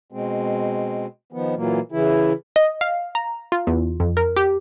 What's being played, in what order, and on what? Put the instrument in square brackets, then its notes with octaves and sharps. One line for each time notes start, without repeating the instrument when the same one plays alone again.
[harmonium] B2 G#3 C4
D#3 F3 B3
A#2 E3 F#3 A#3
C#3 E3 E4
[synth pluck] D#5
F5
A#5
F4
E2
F2
A#4
G4